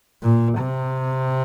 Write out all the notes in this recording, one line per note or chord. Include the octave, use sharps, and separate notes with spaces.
A#2
C3